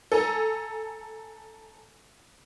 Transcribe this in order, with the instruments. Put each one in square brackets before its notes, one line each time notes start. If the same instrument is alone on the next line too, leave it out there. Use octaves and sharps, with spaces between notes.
[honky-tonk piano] A4 G#5 A#5